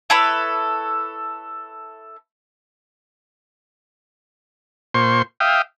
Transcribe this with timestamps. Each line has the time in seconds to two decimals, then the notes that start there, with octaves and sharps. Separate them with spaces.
0.10 E4 A4 B4 C#5
4.94 A#2 C5 C6 C#6
5.40 E5 F5 G5 D#6